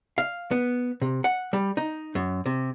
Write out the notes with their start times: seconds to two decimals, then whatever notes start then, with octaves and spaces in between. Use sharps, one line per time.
0.18 F5
0.51 B3
1.01 C3
1.24 F#5
1.53 G3
1.77 D#4
2.15 F#2
2.46 C3